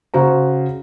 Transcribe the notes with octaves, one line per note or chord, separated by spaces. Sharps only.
C#3 F#4 C5 A#5